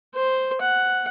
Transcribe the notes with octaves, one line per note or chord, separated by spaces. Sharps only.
C5
F#5